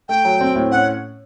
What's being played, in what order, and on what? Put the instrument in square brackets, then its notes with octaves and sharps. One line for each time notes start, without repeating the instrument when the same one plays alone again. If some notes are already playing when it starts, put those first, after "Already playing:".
[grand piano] A3 [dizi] G5
[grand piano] F#3
C4
A2
[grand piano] C#4 [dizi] F#5